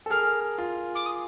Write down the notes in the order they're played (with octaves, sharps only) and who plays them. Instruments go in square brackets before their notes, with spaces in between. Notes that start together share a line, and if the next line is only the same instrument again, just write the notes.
[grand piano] A4
[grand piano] G#4 A#4 [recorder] F6
[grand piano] F4
[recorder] D6
D#6